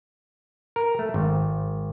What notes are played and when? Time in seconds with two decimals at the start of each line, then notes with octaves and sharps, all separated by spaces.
0.76 A#4
0.99 A3
1.14 G#1